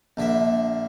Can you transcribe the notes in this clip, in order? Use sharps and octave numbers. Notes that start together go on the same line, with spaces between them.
A#1 D3 E5